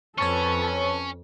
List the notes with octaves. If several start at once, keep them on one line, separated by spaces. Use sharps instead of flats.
F2 C#4 A4 B4 C#5 A5 C#6